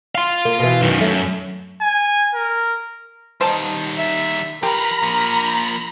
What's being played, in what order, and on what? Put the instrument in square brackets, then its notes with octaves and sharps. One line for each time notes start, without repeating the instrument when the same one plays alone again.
[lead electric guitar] F5 C6
[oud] A#3
B2 E3
[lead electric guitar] F#2 D#3
[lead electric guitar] F#2 [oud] A3
[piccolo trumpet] G#5
A#4
[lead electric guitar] D#3 G3 [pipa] C5 D#5 A5
[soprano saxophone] E5
[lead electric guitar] F3 B4 [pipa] G4 [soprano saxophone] A#4 [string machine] A#5 B5
[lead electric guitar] F3 A#3